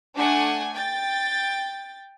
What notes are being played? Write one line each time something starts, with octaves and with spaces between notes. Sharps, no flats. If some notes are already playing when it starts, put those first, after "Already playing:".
A3 D4 F#5 G#5
G5 A6